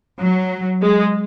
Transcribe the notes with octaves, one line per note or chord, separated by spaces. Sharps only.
F#3
G#3